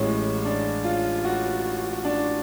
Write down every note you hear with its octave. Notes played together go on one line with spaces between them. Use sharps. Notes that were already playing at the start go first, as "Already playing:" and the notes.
Already playing: A1 A2 G#3 C#4
D4
F4
F#4
D4